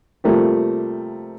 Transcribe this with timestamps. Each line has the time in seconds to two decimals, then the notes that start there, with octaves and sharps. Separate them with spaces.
0.24 C3 F3 G3 A3 A#3 G4